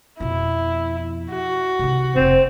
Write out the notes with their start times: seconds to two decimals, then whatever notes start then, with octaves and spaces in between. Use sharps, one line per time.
0.20 F2 B2 E4
1.31 F#4
1.79 C3 D#3
2.16 F1 C3 C4